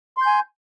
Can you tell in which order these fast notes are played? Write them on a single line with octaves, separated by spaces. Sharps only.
C6 G6 G#5